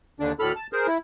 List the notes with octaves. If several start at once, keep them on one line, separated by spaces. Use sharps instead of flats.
D#2 D3 D4
D2 A2 A4 B5 F6
A5
G#4 A#4 C5
E4